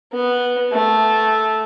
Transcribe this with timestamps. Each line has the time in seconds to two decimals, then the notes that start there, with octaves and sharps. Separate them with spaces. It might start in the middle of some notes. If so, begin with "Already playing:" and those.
0.12 B3
0.72 A3